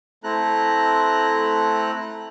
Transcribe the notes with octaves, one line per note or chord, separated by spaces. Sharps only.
A3 C4 E4 A4 A#5 F#6